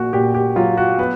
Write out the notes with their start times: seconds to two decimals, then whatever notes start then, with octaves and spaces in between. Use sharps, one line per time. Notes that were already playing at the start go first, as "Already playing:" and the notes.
Already playing: A#1 A#2 F#4
0.13 A#2 G4
0.35 G4
0.56 F#3 F4
0.77 F#4
0.98 B3 B4